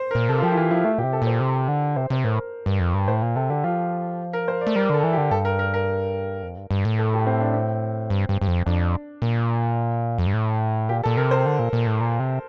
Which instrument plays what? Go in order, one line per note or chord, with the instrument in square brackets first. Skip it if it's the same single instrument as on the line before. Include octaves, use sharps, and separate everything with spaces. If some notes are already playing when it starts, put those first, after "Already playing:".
Already playing: [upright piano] C5
A#4
[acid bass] A#2
[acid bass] C3 [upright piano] A4
[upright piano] F4
[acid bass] F3 [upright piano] G4
[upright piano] E4
[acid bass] E3 [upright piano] F4
[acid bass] F3 [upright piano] E4
[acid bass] A3 [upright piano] F4
[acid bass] A#2 [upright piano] G4
[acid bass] C3
[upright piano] A4
[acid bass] A#2 [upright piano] C5
[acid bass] C3
D3
[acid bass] C3 [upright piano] C5
[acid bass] C3 [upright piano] C5
[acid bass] A2 [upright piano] A#4
[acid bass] G2
F2
G2
[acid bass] A2 [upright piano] C5
[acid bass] A#2
[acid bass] C3 [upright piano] A4
[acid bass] D3 [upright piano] G4
[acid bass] F3 [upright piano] F4
[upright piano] A#4
C5
D5
[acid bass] A3
[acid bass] G3 [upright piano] A#4
[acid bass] D3 [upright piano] A4
[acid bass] E3
[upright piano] G4
[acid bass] D3
[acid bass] G2 [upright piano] A4
[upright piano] A#4
A#4
A#4
[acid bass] F2
G2
G2
A2
[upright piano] A4
G4
C4
D4
C4
[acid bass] G2
G2
G2
F2
[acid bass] F2 [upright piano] D4
[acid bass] A#2
F2
G2
A2
[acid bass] A#2 [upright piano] G4
[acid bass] A#2 [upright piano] A4
[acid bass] C3 [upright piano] A#4
[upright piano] C5
[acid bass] D3
A#2
A#2
A2
A#2
C3